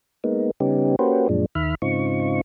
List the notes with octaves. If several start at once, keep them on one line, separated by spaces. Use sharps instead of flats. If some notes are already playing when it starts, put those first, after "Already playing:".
G#3 A#3 B3 D#4
C#3 G3 B3 C#4 D#4 G4
A#3 C#4 F#4 G4 B4 C5
F#2 A#2 F3 G#3 D4
D#2 D#3 E5 B5 F6
G#2 C#3 C4 D#4 F4 C#6